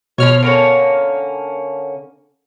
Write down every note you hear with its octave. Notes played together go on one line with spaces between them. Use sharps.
B2 F3 C#5 F6
D3 A#3 C#4